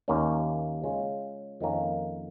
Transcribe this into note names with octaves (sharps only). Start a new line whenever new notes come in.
D#2 D#3 A#3 C#4
C#3 G#3 C#4 F4
F2 D#3 A#3 C#4 A#4